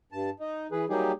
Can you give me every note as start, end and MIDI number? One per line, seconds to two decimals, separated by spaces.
0.12 0.30 43
0.12 0.30 81
0.40 0.67 63
0.72 0.85 52
0.72 0.85 68
0.72 0.85 71
0.89 1.12 54
0.89 1.12 55
0.89 1.12 58
0.89 1.12 63
0.89 1.12 67
0.89 1.12 68